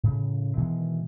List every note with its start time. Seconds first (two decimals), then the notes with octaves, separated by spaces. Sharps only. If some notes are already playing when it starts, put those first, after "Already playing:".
0.03 A2 C#3
0.57 B2 D#3 E3 G#3